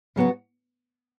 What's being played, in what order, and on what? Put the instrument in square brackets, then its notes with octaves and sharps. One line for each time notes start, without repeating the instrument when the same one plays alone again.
[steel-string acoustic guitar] C#3 F#3 B3 F#4